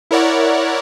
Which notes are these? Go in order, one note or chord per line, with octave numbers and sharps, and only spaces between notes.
E4 A#4 C#5 D5 F#5